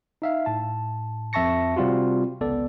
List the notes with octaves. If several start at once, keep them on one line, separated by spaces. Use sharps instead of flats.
D#4 E5 F5
A2 A5
F2 E5 A5 C#6 A#6 C#7
C3 G3 C4 F4 F#4
G#1 C#2 B3 A4 D5